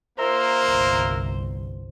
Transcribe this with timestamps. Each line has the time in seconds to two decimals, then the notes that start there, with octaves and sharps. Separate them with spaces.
0.18 A#2 A#3 A#4 C5 E5
0.66 G1 C2